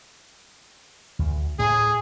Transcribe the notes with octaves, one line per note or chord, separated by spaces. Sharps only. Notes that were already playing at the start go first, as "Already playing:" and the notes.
D2
A2 A3 G#4